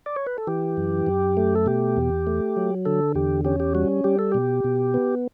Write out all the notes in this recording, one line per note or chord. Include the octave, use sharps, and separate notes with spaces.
D5
C#5
B4
A4
E3 G4
F#2
F#2
A3
A4
B2 G4
E2
A3
F#3
D3 A4
E2 G4
C#4 G4
G4
G3 F#4
G3 G4
A4
B2 G4
B2
B3